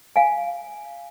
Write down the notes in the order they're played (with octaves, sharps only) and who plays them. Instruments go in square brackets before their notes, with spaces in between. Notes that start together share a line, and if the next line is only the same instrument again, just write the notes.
[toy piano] F5 G#5